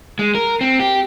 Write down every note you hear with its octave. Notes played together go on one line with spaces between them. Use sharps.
G#3
A#4
C4
G4